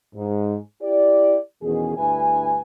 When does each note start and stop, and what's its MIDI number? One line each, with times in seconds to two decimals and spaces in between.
0.15 0.55 44
0.81 1.36 64
0.81 1.36 67
0.81 1.36 74
1.62 1.96 40
1.62 1.96 47
1.62 1.96 51
1.62 1.96 61
1.62 1.96 68
1.97 2.60 38
1.97 2.60 43
1.97 2.60 64
1.97 2.60 71
1.97 2.60 80